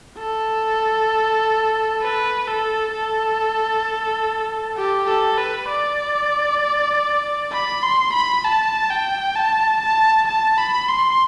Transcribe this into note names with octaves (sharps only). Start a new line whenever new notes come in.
A4
B4
A4
A4
G4
A4
B4
D5
B5
C6
B5
A5
G5
A5
A5
A5
B5
C6